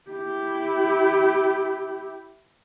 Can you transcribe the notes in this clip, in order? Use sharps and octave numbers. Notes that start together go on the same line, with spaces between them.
E4 G4